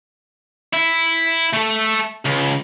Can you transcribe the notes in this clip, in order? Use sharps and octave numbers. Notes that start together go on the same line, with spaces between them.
E4
A3 A4
C#2